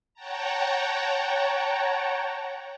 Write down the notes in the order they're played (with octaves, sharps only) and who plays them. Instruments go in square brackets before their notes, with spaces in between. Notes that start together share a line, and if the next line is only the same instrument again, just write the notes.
[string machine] C#5 F#5 G5 A5 A#5